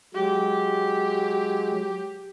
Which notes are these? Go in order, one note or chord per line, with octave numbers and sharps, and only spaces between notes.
F#3 G#3 G4